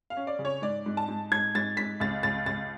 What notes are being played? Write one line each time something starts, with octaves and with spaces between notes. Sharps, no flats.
F5
C#4
D5
C#3
C#5
G#2 D5
G#2
A5
G#2
G#2 G#6
G#2 A6
G#2 B6
C#2 A6
C#2 A6
C#2 A6